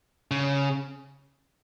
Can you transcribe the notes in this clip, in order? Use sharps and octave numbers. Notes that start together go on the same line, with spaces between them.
C#3